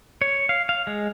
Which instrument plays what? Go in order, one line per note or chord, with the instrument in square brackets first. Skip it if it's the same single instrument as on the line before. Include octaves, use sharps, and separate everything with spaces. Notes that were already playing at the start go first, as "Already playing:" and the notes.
[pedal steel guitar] C#5
F5
F5
G#3